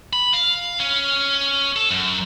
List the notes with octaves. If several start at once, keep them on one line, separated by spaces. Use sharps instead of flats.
B5
F5
C#4
A4
F#2